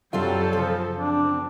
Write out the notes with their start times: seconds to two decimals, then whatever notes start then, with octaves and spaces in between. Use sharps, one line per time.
0.13 F#2 F#3 G3 C4 F4 A4 C5 F5
0.53 C#3 F3 F4
0.97 C4 D4